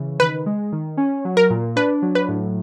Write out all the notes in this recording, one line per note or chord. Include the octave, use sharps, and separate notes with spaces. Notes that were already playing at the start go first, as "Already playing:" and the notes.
Already playing: C#3 E3
D#3 B4
G#3
D#3
C#4
F#3
A#4
A#2
D4 B4
F#3
B4
A2